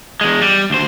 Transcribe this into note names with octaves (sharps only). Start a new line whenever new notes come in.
E2 G#3
G3
D2 C5